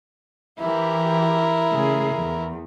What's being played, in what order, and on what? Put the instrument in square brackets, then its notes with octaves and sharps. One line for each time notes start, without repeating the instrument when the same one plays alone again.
[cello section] E3 G4 [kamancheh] E4 A#4
[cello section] C#3 A3 G#4
E2